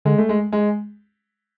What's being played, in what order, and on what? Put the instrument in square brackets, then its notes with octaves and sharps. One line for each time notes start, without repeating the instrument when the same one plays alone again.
[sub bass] D3 [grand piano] G#3
[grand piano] A3
G#3
G#3